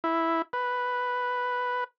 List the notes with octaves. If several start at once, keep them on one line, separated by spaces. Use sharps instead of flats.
E4
B4